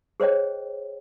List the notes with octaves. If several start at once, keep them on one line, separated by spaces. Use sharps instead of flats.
G#4 C5 C#5 D#5 G5